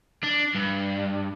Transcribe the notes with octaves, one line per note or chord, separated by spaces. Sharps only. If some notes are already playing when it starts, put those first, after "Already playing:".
D4
G2